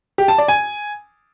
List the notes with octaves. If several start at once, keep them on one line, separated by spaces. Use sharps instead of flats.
G4
A5
D5
G#5